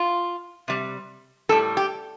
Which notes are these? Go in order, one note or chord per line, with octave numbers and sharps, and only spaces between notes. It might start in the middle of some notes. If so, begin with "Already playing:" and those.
Already playing: F4
C3 G3
A2 G3 A4
G4